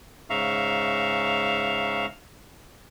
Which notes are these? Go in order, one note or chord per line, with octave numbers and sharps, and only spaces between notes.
G#2 C#3 E5 F5 A#5 C#6